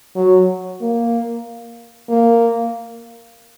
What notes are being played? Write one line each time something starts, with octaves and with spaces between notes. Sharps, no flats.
F#3
A#3
A#3